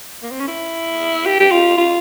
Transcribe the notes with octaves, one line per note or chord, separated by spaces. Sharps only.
A#3
C4
C#4
E4
G4
G4
F4
F4